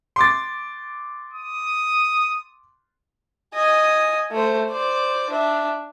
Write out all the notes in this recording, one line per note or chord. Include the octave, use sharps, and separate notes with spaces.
C6 D6 A6
D#6
D#5 G#5
A3 C5
C5 D5
D4 E5